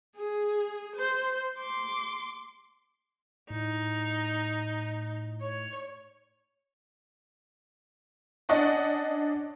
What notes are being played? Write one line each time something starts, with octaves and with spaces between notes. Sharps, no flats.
G#4
C5
C6 D6
A2 D#4
C#5
C#4 D4 D5 D#5 F#5